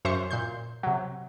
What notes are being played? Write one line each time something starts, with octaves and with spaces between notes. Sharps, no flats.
F#2 C5 E5 C#6
A#2 C6 G6
C3 F#3